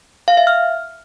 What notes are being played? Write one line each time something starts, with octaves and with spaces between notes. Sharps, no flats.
F5
E5
F6